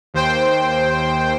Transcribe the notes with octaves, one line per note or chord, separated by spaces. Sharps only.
D#2 C5 G5